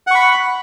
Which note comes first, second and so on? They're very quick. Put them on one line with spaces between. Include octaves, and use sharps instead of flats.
F#5 C#6 B5